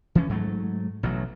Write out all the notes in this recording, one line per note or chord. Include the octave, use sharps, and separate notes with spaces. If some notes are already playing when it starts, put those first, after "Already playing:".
E3 F3 C#4
G#2 F#3 A3
A1 B2 F#3